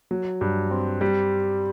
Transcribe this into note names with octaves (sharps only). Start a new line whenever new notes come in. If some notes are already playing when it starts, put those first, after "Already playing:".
F#3
G2
C4
G3